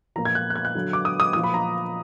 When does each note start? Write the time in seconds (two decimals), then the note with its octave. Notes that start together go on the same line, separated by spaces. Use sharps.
0.16 A#2 F3 A#5
0.25 G#6
0.35 F#6
0.50 F#6
0.56 G#6
0.65 F#6
0.75 D3 F#3
0.93 D6
1.05 D#6
1.20 D#6
1.33 A#2 F3 D#6
1.44 B5
1.54 A#5